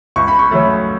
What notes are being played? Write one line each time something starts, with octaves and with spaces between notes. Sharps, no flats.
C#2 C#6
B5
C#6
C#3 F#3 A3